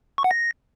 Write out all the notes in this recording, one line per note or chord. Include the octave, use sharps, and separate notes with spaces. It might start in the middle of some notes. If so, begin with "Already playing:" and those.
C#6
F#5
A#6